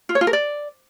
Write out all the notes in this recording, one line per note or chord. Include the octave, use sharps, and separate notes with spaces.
F4
C#5
F4
A#4
D5